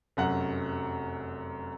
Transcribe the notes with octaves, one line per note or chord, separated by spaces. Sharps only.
F1 F#2 F#5